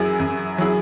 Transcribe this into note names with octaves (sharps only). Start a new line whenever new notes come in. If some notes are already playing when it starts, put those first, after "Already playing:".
Already playing: F#2 F#3 E4 G#4
F#2
F#3 E4 G#4